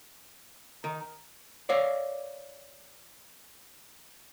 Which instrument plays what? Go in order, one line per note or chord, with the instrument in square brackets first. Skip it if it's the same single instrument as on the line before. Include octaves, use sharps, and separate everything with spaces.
[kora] D#3 [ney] A#5
[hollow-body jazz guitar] C#5 D5 E5 F5